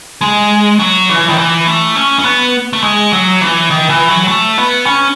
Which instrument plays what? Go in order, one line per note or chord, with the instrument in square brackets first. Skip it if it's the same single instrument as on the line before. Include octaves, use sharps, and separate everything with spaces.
[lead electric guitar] G#3
F#3
E3
D#3
E3
A3
C#4
C#4
B3
A3
G#3
F#3
E3
D#3
E3
F#3
A3
B3
C#4